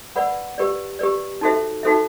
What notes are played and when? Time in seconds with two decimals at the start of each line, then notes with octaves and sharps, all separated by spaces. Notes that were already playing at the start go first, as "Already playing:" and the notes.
0.16 B4 D5 F#5 B5
0.58 G4 B4 D5
0.99 G4 B4 D5
1.41 D#4 F#4 A4 C5 E5
1.83 D#4 F#4 A4 C5 E5